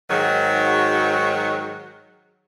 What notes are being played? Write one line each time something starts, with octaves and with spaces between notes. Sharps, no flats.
G#2 D#3 F#3